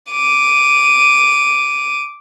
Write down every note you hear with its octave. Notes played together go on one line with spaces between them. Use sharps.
D6 D#7